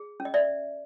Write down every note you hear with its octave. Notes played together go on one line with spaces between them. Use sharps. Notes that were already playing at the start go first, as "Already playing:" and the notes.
Already playing: G#4
C#4
D#5
D5 E5